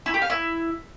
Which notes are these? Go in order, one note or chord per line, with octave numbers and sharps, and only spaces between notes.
E4
G4
F5
E4